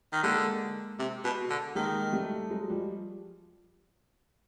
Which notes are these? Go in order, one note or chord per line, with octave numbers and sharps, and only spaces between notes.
D#3
D3 G#3 A#3
C3
B2
D3
D#3 G#3 A#3
G3 A3
F#3 G#3
F3 G3